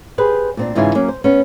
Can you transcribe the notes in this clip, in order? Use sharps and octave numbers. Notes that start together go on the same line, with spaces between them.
G4 G#4 B4 C5
A#2 C4 D4
G#2 C#3 E3 F4 E5 G#5
F#3 A#3 C#4
C5
B3 C#4